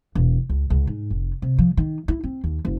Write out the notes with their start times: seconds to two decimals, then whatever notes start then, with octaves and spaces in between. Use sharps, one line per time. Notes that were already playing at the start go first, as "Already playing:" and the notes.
0.15 E1
0.49 C#2
0.70 C#2
0.87 G#2
1.10 F1
1.42 C3
1.59 F3
1.77 D#3
2.08 E4
2.24 C4
2.44 D#2
2.65 F#1